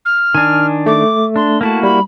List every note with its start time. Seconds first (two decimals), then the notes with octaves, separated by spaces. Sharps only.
0.05 F6
0.35 D#3 D4 G#5
0.86 A3 D6
1.36 D4 C6
1.61 A#3 E4 F#4 A5
1.83 G3 B5